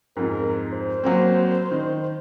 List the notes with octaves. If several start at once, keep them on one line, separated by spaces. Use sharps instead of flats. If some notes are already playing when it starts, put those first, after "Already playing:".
F2 G#2 A#4
C5
F#3 A#3 C4
D#3